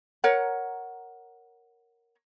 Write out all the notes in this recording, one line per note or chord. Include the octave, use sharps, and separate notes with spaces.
A#4 C#5 F#5